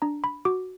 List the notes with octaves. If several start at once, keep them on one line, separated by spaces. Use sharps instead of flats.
D4 A#5
B5
F#4 D6